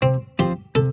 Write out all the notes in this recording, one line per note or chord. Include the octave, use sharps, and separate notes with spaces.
C3 C4
F3 C4 F4 G4 C5
C3 A4